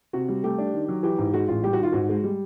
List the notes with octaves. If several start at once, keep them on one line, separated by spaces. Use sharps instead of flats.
C3 F#4
G3
A3 G4
D4
D#3
F#3
E3 G4
G#2
G#3 F#4
A1 F4
G3 G4
F#4
D#3 F4
G#2 F#4
G#3
G3